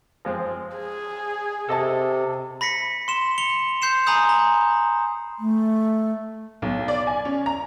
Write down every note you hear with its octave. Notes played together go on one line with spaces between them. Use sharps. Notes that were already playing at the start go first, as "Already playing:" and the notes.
F3 G#3 C4
G#4
C3 A4 D#5 A5
B5 A#6 B6 C#7
C6 E7 G7
C#7 F7 G7
C6 G6 C7 E7
G#5 A#5 B5 D#6 G6
A#5
A3
B1
D5
G#5
C#4
A#5